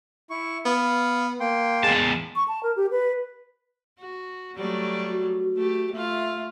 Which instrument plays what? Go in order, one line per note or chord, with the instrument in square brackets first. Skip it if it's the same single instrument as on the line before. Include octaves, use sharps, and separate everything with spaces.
[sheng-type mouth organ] E4 C#6
[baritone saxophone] B3 [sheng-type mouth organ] F5
[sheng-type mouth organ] A#3 G5 C6
[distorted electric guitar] E2 A5 [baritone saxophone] G#3
[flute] C#6
A5
A#4
G4
B4
[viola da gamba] F#4
F#3 G3 A3
[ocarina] F#4
[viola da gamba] A3 G4
[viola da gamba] A3 F4 [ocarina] E5